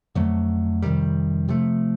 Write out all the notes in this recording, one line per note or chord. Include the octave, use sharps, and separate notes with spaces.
F2 D3 F#3 A3
F2 C3 D#3 G3
C3 F3 A3